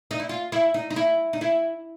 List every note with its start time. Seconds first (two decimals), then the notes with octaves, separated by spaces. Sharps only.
0.11 D#4
0.20 E4
0.29 F4
0.52 E4
0.74 D#4
0.90 D#4
0.96 E4
1.33 D#4
1.41 E4